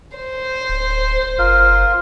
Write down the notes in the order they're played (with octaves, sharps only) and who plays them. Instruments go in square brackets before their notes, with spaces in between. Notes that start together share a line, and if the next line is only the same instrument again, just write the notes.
[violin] C5
[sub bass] D1
[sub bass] F#1 [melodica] F4 A#4